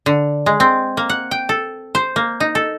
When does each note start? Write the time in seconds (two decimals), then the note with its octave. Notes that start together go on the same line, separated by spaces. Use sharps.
0.06 D3
0.46 G#3
0.60 C4
0.97 A#3
1.10 F#5
1.31 G5
1.49 A4
1.95 C5
2.16 A#3
2.40 D#4
2.55 A4